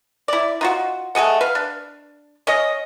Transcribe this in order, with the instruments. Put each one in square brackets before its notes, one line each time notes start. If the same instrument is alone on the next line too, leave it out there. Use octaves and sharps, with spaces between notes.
[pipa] E4 D5
D#4 F4 F#4
A3 G#4 D#5 F#5
B4 F5
D4
C#4 C#5 D#5